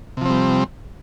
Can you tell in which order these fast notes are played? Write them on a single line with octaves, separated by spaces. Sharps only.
C3 F3 C4 G3